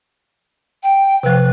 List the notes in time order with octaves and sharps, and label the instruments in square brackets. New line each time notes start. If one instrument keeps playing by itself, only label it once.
[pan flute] G5
[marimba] C3 F3 [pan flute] B4